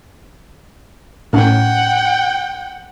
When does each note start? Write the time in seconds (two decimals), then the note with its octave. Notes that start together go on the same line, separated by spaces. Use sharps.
1.33 A2 C#4 F#5 G5